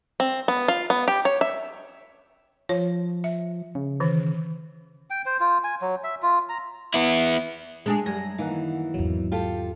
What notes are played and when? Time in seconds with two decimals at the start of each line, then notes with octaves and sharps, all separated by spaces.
0.20 C4
0.48 B3
0.68 F4
0.90 B3
1.08 G4
1.25 C#5
1.41 E5
2.69 F3 C#5
3.24 E5
3.75 C#3
4.00 D#3 E3
5.10 G5
5.26 C5
5.40 F4
5.64 G#5
5.82 F#3
6.04 E5
6.22 F4
6.49 A#5
6.94 B3 E4
7.86 G#3 D4 G#4
8.06 F#2 G3 G#5 A#6
8.38 D#3 E3 A#3 D#4 F#5
8.94 G#1 E2 F#3
9.32 F4 G4 A4